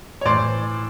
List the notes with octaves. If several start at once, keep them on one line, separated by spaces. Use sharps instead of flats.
C#5
A2 E3 C5 D5